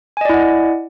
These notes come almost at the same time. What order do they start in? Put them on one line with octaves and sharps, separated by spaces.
G#5 D#5 D5 E4 F#5